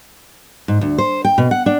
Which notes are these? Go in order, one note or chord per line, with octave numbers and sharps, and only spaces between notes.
G#2
D2
C5
G5
B2
F#5
D4